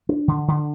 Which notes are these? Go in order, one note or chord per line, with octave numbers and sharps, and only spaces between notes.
D4
D3
D3